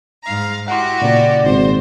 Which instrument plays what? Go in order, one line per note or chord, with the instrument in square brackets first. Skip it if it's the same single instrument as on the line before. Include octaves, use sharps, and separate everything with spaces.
[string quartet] G#2 F5 A#5
[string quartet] E4 F#4 G4 [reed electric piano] F#5 C6
[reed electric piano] A#2 C#3 A#3 [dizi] D5
[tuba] G#1 [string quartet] C5